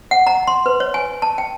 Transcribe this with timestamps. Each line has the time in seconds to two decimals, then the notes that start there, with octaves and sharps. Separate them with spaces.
0.11 F#5
0.27 A#5
0.47 C6
0.66 B4
0.80 C#5
0.94 G#5
1.22 A5
1.38 G5